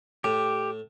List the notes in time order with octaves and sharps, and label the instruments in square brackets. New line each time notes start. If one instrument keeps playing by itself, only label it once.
[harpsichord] A2 [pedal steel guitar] G4